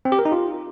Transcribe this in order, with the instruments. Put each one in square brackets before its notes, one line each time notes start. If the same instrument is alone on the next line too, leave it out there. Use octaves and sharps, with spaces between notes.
[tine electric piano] C4
G4
A#4
D#4
F4